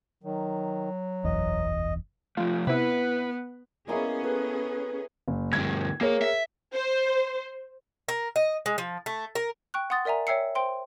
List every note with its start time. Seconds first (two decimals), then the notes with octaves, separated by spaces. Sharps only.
0.24 D#3 F#3
1.25 F#1 B1 E2 D#5
2.37 F3 A3 F4
2.67 C3 B3 E4 B4
3.88 G#3 A#3 B3 C#4 E4 G#4
4.24 A4 B4
5.28 F#1
5.53 D2 G2 G#6
6.01 A#3 G#4 A#4 C#5
6.22 E5
6.74 C5
8.09 A#4
8.36 D#5
8.66 G#3
8.78 F3
9.06 A3
9.35 A#4
9.74 G5 C#6 F#6
9.90 F#5 C6 D#6 A6
10.05 A#4 D5 E5 G#5 A#5
10.27 C#5 E5 G5 E6 C7 C#7
10.55 C5 G5 C6